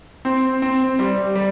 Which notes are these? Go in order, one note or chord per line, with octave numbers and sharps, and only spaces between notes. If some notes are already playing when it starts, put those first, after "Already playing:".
C4
C4
G3
G3